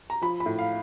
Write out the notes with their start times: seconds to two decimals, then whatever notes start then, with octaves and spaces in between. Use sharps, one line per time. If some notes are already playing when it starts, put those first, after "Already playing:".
0.10 A#5
0.21 F3 B5
0.40 B5
0.46 A2
0.59 F5